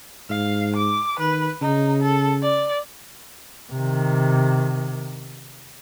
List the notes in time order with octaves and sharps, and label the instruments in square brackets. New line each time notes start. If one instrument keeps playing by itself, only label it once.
[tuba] G#2 [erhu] F5
[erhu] D6
[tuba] D#3 [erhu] B4
[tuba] C#3 [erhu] D#4
[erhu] A4
D5
[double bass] C3 D#3